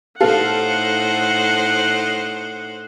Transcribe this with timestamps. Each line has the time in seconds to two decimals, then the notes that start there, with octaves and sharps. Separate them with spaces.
0.21 A2 D#4 A4 C5 F5 F#5